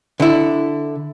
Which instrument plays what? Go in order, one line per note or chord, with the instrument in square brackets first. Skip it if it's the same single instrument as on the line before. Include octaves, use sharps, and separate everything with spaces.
[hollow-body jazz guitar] D3 E4